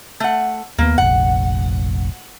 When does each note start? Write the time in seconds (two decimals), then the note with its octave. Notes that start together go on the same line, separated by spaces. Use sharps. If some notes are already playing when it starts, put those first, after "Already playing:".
0.20 A3 F#5
0.78 D#2 G#3 A#3 B3
0.98 F1 A#1 F#5